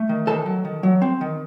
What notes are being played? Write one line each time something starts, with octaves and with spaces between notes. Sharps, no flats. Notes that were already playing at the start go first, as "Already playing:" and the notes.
Already playing: A3
D#3
D#3 A4 A5
F#3
D#3
F#3
C4
D#3